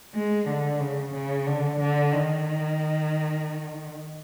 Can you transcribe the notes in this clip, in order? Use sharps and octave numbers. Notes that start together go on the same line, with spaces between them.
G#3
D3
C#3
C#3
D3
D3
D#3